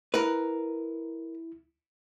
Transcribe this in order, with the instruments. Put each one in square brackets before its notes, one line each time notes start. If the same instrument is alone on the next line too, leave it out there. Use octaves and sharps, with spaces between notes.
[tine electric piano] E4 [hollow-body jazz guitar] A#4 B4